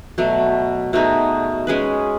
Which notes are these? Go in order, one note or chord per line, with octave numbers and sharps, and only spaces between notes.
B2 F#3 A3
B2 A3 D#4 G#4
G#3 C#4 G#4 B4